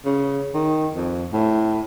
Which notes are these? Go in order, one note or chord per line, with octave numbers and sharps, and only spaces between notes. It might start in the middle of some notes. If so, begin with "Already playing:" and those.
C#3
D#3
F2
A2